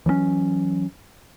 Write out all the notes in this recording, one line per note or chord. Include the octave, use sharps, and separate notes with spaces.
E3 F#3 G#3 C#4